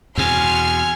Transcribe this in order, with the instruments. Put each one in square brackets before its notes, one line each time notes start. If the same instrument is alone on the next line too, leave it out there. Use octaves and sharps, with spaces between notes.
[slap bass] E2 B2 [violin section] F#5 C6 F6 [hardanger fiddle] G#5